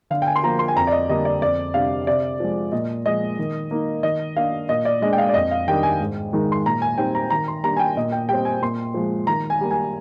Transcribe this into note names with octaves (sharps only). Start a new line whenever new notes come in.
D3 F5
G5
G#5
C6
F3 A#3 A#5
C6
G#5
F2 A#5
D5
D#5
D3 G3 A#3 D4 D#5
D5
F2 D5
C3 G3 D4 F5
C3 D5
F3 G#3
A#2 D#5
F3 G#3 D#5
D#3
A#3 D#4
D#3 D#5
A#3 D4 F5
A#2 D#5
D5
G#3 D4 D#5
G5
F5
D5
F2 D#5
F5
D#3 G3 D4 G5
G#5
G#2
D#3 G#3 D#4
C6
A#2 A#5
G#5
G3 C4 D#4 G5
A#5
D#3 A#5
C6
G3 A#3 D4 A#5
G#5
G5
A#2 D#5
G5
G3 C4 G5
G#5
A#2 C6
F3 G#3
D#3 A#5
G#5
G3 A#3
G#5